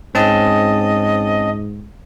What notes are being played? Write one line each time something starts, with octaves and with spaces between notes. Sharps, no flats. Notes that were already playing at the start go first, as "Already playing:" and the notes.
G#2 C4 C#4 D#5 A5